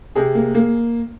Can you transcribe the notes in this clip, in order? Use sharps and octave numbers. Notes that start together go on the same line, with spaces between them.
C3 G#4
A#3
A#3